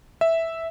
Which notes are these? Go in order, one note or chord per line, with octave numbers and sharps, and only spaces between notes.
E5